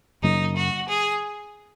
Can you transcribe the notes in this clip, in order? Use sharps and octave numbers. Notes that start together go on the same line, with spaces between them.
F#2 C#3 F#3 A#3 D#4
F#4
G#4